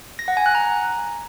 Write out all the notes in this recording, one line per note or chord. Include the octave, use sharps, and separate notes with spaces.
A#6
F#5
G#5
F#6
A#5